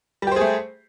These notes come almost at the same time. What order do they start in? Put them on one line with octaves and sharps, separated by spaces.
G3 G4 C5 G#4 A3